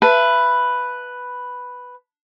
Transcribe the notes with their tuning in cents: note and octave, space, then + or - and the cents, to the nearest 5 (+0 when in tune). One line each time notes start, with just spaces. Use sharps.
B4 +0 E5 +30 A5 +5